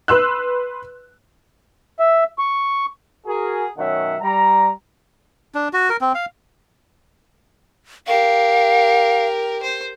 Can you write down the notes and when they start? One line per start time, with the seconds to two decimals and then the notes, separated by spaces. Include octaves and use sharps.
0.08 B4 C6 E6 F#6
2.00 E5
2.39 C#6
3.27 F#4 G#4 A#4
3.78 B2 D#3 F#3 C#4 E5 F#5
4.21 G3 A#5
5.55 D4
5.73 F#4
5.90 A#4
6.01 C4
6.15 F5
8.07 G4 A#4 F5
9.63 C5